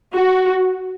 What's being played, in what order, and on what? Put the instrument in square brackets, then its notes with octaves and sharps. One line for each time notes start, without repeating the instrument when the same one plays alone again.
[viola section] F#4